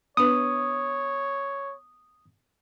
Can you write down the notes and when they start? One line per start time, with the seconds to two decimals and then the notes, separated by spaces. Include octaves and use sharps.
0.17 B3 D4 B4 C#5 D#6